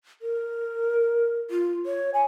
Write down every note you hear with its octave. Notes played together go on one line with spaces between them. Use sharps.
A#4
F4
C#5
G#5